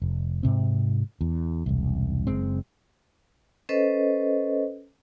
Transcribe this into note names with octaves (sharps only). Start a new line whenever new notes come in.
F1
G#2 C3 C4
E2
E1 C2
F#1 G#3 C4
C#4 A4 B4 C5 D#5